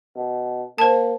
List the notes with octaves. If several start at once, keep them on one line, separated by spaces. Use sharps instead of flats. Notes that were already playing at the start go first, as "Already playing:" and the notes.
B2
A#3 C5 A5